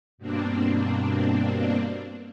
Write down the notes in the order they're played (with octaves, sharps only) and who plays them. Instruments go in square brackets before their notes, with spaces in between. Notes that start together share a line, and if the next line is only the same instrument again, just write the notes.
[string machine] G2 B2 A#3 C4 D4